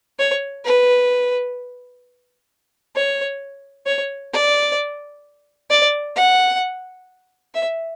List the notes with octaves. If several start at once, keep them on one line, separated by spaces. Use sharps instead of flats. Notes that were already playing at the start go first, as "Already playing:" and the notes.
C#5
B4
C#5
C#5
D5
D5
F#5
E5